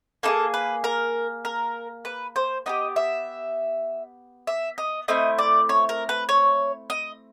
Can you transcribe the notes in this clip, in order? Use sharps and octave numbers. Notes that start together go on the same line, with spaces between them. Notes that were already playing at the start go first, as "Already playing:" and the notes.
A#3 D#4 G#4 A4
B4
A#4
A#4
B4
C5
B3 D#4 G4 D#5
E5
E5
D#5
A3 C4 E4 D#5
D5
C#5
A#4
B4
C#5
D#5